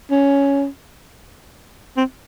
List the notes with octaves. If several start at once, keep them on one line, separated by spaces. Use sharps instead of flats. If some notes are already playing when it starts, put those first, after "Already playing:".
C#4
C4